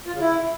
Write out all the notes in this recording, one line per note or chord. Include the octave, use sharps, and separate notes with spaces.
F4
C#3
E4